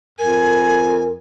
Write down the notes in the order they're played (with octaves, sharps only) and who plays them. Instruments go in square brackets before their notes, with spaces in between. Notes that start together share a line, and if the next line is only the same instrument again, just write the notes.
[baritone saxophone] F2 [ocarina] A#4 [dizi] G#5